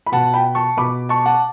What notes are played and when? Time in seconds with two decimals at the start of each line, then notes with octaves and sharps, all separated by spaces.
0.06 B5
0.12 B2 F#5 A5
0.34 G5 B5
0.55 A5 C#6
0.77 B2 B5 D6
1.09 A5 C#6
1.26 F#5 A5